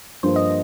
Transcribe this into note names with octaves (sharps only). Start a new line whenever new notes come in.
G2 F3 A#3 C5
D#5